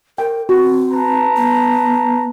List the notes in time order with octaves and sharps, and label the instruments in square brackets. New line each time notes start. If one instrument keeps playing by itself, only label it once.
[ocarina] A#4 [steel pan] G5
[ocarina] C4 [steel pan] F#4
[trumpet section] B4 A5 A#5
[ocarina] B3